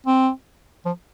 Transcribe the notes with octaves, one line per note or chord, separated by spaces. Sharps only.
C4
F3